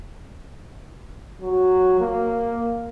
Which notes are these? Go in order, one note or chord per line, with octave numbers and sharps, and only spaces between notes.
F#3
A#3